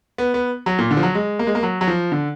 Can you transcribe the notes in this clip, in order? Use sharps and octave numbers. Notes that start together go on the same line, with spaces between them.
B3
B3
F#3
A#2
D3
F3
F#3
G#3
A#3
G#3
A#3
F#3
F#3
F3
D3